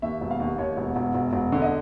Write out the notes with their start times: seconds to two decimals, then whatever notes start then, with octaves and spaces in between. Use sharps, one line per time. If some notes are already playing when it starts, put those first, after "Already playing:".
0.02 D#2 E5
0.21 E1
0.31 F5
0.40 D#2
0.58 D#2 C#5
0.77 E1
0.96 E1
1.14 E1
1.33 E1
1.52 D3
1.62 D#5